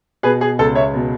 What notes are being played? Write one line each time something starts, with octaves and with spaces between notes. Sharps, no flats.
B2 G#4 B4
G#4
C#2 A4
C#5 E5
B2